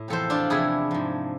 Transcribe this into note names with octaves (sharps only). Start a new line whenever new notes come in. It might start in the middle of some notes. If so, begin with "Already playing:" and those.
Already playing: A2
E2 C3 F3 A4 C5
D4 F4
E2 C3 F3 E4 G#4
G#2 F3